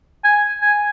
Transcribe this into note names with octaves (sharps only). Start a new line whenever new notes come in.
G#5
G#5